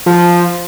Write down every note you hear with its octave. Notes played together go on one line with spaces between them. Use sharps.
F3